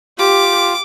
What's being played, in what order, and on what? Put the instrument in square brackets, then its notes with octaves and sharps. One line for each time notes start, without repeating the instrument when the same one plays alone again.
[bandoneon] F4 [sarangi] G4 [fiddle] D6